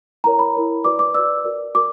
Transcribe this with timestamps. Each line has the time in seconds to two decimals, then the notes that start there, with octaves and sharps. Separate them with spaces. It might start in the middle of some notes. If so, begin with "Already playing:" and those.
0.24 E4 A#4 C#5 A#5
0.39 B5
0.54 E4 A#4 C#5
0.84 F#4 B4 D5 D6
0.99 D6
1.14 F#4 B4 D5 E6
1.44 F#4 A#4 D5
1.74 F#4 A#4 D6